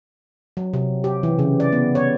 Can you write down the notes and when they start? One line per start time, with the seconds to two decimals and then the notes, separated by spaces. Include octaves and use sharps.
0.57 F#3
0.74 C3
1.04 G4
1.23 E3
1.39 C#3
1.60 D5
1.72 B3
1.95 C#5